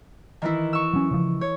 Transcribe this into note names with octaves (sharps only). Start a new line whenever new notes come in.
D#3 E3 E4
C#6 E6
F#3 C#4
C#3 F3
C#5